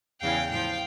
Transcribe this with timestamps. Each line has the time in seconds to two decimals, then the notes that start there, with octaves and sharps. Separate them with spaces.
0.22 E2 C#3 E3 F5 G5
0.51 A2 F3 F5 G5